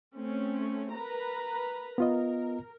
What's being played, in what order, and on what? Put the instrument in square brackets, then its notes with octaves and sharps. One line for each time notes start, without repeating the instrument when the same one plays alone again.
[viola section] A3 C4 C#4
A#4 B4 A#5
[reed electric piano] B3 F4 D#5 [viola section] A#4